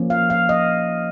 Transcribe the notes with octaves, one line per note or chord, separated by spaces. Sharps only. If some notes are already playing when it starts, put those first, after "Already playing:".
Already playing: F3 A#3 C#4
F5
F5
D#5